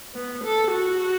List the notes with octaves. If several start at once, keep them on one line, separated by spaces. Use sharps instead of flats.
B3
A4
F#4